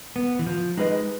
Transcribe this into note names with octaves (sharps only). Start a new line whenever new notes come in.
B3
E3
F3
G#3 D#4 G4 B4 D#5